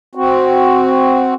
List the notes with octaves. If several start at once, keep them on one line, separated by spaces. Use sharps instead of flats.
C4 F#4